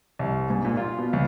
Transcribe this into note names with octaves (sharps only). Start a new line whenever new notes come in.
C2
G#2
A#2
F4
B2
C#2